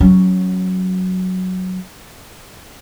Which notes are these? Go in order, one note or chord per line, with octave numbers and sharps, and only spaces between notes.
F#3 C#4